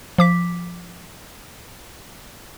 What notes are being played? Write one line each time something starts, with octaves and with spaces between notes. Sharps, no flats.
F3 D6 B6